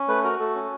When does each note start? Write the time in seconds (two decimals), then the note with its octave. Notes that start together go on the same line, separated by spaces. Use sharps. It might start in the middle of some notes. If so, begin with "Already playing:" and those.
Already playing: C#4
0.08 A3 B4
0.24 F#4 A#4
0.39 A3 A4
0.55 C#4